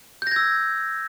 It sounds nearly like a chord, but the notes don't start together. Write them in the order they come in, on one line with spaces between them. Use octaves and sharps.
G6 A#6 G#6 E6